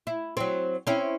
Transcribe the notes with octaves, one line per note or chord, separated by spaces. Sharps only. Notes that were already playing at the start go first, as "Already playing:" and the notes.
E4
F#3 C4
C4 C#4 E4